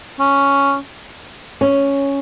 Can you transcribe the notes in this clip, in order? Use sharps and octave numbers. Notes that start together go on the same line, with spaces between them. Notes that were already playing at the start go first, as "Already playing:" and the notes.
C#4
C#4